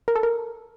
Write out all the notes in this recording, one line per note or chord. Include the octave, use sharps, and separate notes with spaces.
A#4
A4
A#4